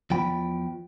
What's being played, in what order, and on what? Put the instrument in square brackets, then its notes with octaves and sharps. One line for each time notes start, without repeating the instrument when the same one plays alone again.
[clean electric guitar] E2 F3 G5 B5